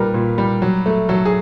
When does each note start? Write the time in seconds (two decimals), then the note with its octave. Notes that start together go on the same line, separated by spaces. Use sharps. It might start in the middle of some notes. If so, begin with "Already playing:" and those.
Already playing: A#2 G3 A#4 B4
0.14 A#2
0.38 G3
0.62 F#3
0.86 A3
1.09 F#3 A4
1.25 G#4